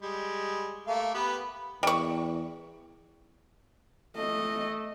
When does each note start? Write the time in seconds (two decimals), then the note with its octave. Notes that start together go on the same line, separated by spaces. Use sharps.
0.02 G3 G#3
0.87 A3 A#3 F5
1.14 B3 G4 B4
1.83 E2 G3 C#6
4.17 A3 D#5